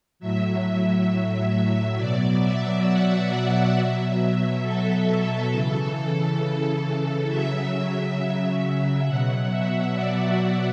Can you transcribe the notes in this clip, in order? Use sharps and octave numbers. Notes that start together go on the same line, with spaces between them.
A2 F#3 E5
E5
B2 F#3 D5
E5
F#5
B2 F#3 E5
A4
C#3 E3 A4
C#3 F#3 E5
E5
B2 F#3 F#5
E5
D5
E5